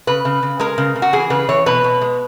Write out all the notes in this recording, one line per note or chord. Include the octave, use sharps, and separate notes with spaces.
C#3 B4
C#3
C#3
G#3 A#4
C#3
C#3
F#4
E3 G#4
C#3 B4
E3 C#5
B2 B4
B2
G#3